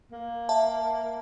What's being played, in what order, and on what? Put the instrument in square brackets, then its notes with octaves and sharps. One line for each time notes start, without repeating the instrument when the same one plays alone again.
[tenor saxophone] A#3
[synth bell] E5 A5